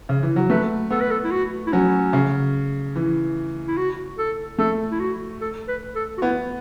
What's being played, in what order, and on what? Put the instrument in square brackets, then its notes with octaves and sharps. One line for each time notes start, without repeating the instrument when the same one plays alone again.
[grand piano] C#3
E3
F#3
[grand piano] A3 [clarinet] B4
[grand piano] B3 [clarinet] A4
[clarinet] B4
A4
E4
F#4
E4
[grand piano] F#3 [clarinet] C#4
[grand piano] C#3
E3
[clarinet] E4
F#4
A4
[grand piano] A3 [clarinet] A4
[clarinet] E4
F#4
A4
B4
A4
F#4
[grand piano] B3 [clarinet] E4